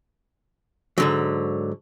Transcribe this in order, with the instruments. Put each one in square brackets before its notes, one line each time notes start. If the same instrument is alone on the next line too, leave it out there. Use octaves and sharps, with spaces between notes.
[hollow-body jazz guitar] G#2 D3 F#3